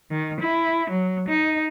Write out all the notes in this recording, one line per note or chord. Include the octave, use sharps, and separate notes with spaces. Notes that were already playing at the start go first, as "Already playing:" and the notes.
D#3
E4
F#3
D#4